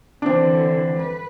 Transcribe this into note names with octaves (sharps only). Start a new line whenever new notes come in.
D3 E3 C4 D4
B4